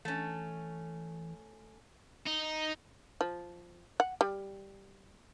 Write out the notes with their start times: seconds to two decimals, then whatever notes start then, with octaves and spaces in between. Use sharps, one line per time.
0.05 E3 A3 C#4
2.26 D#4
3.21 F3
4.00 F#5
4.21 G3